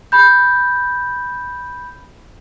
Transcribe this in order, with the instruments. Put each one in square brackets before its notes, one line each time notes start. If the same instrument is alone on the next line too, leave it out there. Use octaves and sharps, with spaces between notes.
[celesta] B5 G6